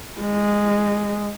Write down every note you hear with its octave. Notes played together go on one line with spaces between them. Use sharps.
G#3